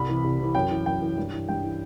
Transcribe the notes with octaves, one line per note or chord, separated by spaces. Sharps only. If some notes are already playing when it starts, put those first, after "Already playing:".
Already playing: C2 B5
C3 E3
C2
C3 E3
F#2 G5
E3
F#2 G5
E3
G2
E3
G2 G5
E3